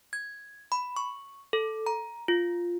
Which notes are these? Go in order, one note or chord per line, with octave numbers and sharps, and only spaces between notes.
G#6
B5
C#6
A4
A#5
F4